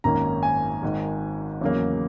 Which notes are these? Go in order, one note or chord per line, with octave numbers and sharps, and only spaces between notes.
G#1 F#2 D#3 A#3 C#4 A#5
G#5
G#1 G#2 D#3
E2 C#3 F#3 A#3